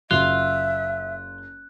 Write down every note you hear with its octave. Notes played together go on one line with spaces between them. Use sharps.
F#1 F4 E5 F#6